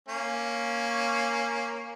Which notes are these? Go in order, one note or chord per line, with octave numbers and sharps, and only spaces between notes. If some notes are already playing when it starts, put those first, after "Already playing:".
A#3 C#4